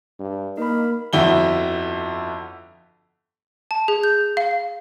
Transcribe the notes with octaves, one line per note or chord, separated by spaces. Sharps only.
G2
A#3 D#4 A#4 B5
G1 F2 E4 F#4 G7
A5
G#4
G6
F5